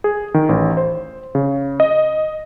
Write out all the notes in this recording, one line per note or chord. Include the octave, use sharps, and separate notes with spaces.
G#4
D#3
A1
C5
C#3
D#5